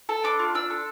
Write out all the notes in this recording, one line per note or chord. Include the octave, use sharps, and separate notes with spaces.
A4
D4 D6
F4
D4 E6
A4